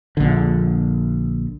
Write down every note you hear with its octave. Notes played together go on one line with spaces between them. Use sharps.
A#1 D3